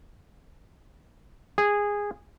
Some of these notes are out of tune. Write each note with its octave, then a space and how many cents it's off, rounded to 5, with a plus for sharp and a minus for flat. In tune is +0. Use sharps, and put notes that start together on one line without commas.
G#4 -15